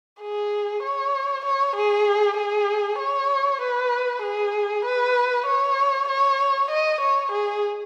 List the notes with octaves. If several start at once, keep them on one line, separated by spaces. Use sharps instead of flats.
G#4
C#5
C#5
G#4
G#4
C#5
B4
G#4
B4
C#5
C#5
D#5
C#5
G#4